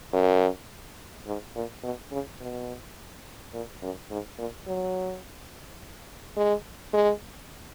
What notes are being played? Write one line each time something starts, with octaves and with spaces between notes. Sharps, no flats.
F#2
G#2
A#2
B2
C#3
B2
A#2
F#2
G#2
A#2
F#3
G#3
G#3